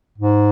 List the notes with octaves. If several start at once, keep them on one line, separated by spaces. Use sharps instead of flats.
G#2